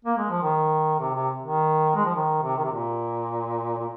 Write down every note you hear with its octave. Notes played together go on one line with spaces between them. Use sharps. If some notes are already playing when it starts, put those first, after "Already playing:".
A#3
G#3
F3
D#3
C3
C3
D#3
G#3
F3
D#3
C3
D#3
C3
A#2
A#2